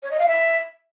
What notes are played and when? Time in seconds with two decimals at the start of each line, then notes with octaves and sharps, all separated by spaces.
0.03 C#5
0.11 D#5
0.19 F5
0.27 E5